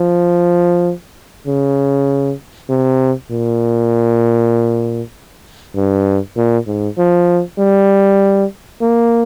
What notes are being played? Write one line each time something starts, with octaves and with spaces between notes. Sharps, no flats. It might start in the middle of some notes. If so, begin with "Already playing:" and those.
Already playing: F3
C#3
C3
A#2
G2
A#2
G#2
F3
G3
A#3